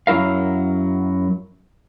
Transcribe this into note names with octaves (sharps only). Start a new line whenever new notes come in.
F#2 F#3 E4 A#4 F5